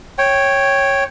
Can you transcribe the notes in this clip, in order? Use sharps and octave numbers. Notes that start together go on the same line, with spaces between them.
C#5 G5